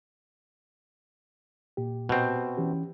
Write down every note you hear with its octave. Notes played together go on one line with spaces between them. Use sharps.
A#2 G4
B2 C4
E3 C#4 G4